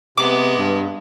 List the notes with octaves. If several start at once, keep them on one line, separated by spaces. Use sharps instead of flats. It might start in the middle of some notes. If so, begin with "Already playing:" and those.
C3 G#3 B3 D6
G2